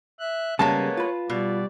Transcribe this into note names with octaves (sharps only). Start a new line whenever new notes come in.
E5 F#6
C#3 G3 G#3 A#3 B3 C#4 C#5 A5
F4 B4
B2 G3 D5